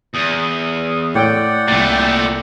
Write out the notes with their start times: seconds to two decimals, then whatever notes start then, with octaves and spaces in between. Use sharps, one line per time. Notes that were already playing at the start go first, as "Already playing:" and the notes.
0.14 E2 D#6
1.15 A2 C#5 D5 F#5 G5 E6
1.68 C2 A#2 A3 A6